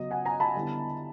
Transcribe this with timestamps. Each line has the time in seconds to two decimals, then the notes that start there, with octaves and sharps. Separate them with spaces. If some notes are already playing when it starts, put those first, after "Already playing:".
Already playing: C#3 F#3 B3 D#5
0.11 F#5 G#5
0.25 G#5 A#5
0.40 A5 B5
0.55 D3 G3 B3 E4